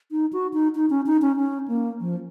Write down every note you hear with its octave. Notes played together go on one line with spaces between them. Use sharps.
D#4
F#4
D#4
D#4
C#4
D#4
C#4
C#4
A#3
F3